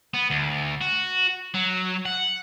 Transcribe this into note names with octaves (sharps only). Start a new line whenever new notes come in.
B3
D2
F#4
F#3
F#5